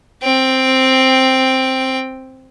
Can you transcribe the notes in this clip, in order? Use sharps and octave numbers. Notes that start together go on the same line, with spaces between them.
C4 G5